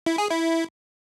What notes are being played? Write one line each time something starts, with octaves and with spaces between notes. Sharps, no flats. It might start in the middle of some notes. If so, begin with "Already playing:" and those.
E4
G#4
E4